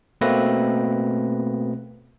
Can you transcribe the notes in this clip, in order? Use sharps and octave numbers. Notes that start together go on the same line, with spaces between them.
B2 A3 A#3 C4 B4 A#6